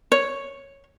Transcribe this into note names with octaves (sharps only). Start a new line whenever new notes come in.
C#5